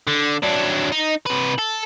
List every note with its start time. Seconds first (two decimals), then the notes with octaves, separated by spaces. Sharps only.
0.07 D3
0.43 F#3 D4
0.92 D#4
1.26 C3 B4
1.59 A4